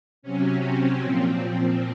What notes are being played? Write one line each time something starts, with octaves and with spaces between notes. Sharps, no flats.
C3 F#3 C#4
C4
A#2 F3 C4
C4